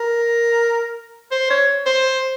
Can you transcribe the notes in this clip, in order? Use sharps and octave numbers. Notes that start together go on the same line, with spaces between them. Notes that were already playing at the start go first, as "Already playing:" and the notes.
Already playing: A#4
C5
C#5
C5